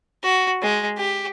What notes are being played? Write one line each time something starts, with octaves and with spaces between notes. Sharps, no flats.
F#4
G#3
G4